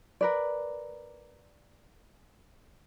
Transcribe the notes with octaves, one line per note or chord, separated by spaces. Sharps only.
A#4 B4 D5